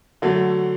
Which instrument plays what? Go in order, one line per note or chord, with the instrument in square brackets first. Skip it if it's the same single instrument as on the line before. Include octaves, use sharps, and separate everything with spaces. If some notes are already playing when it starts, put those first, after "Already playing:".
[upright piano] D3 F#3 A3